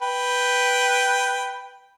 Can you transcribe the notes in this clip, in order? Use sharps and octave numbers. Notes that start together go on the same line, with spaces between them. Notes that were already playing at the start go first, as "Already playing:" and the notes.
B4 G5